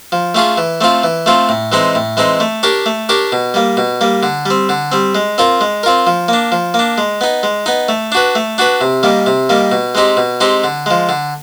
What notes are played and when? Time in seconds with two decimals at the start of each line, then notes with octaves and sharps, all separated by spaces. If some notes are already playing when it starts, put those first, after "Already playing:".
0.12 F3
0.35 A3 C#4 F4 G#4
0.57 E3
0.81 A3 C4 F4
1.04 E3
1.26 A3 C4 F4
1.49 A2
1.72 E3 G#3 C4 D#4
1.95 A2
2.17 E3 G#3 C4 D#4
2.40 A3
2.63 D4 G4 A#4 C#5
2.86 A3
3.09 D4 G4 A#4 C#5
3.32 B2
3.54 G3 A#3
3.77 B2
4.01 G3 A#3
4.23 D3
4.46 G3 C4
4.69 D3
4.92 G3 C4
5.15 G#3
5.38 C4 F4 A#4
5.61 G#3
5.83 C4 F4 A#4
6.07 F3
6.28 A#3 D4
6.52 F3
6.74 A#3 D4
6.98 G#3
7.21 B3 D#4
7.43 G#3
7.66 B3 D#4
7.89 A3
8.12 D4 F#4 B4
8.35 A3
8.58 D4 F#4 B4
8.81 C3
9.03 D#3 G3 A#3
9.26 C3
9.49 D#3 G3 A#3
9.72 B2
9.95 G#3 C4 D#4 G4
10.17 B2
10.41 G#3 C4 D#4 G4
10.64 D3
10.86 F3 G#3
11.09 D3